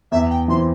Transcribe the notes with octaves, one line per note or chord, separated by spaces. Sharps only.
E2 E5
G5
E3 C4 E4 C6